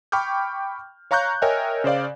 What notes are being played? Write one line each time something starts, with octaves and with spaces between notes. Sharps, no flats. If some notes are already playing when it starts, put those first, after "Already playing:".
G5 B5 C#6 D6 F6 G6
C#5 F5 A#5 C#6 F#6 G6
A#4 C#5 D#5 E5 G5 G#5
C#3 C5 D5 F5